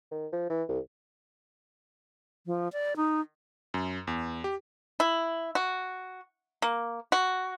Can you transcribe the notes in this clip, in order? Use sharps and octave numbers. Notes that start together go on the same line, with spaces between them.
D#3
F3
E3
C2
F3
D5
D#4
F#2
E2
G4
E4
F#4
A#3
F#4